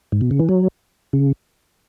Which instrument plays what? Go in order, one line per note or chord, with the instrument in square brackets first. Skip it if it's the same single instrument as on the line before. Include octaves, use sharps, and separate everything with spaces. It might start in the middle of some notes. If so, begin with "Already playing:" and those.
[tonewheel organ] G#2
B2
C#3
E3
F#3
C#3